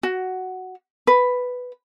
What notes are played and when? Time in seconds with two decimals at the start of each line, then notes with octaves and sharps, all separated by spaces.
0.03 F#4
1.07 B4